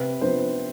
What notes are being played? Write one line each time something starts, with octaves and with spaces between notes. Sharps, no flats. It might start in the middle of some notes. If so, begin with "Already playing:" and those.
Already playing: C3 B4
F3 B3 D4 C5